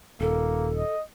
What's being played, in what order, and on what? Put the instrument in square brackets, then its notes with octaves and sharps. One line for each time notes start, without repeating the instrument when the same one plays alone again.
[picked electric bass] D#1 [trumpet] A#3 [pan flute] A4
[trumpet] D#5